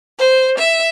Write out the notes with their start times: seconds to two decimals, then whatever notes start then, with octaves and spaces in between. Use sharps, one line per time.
0.17 C5
0.57 E5